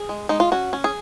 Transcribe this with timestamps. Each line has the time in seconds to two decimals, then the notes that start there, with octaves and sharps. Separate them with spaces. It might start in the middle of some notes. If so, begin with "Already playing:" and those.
Already playing: G#4
0.09 G#3
0.29 G#3 D#4
0.40 F4
0.52 C#4 F#4
0.73 C#4
0.84 G#4